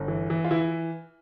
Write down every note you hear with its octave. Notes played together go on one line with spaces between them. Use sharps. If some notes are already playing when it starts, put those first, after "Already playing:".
Already playing: G1
E3
E3
F4
E3 E4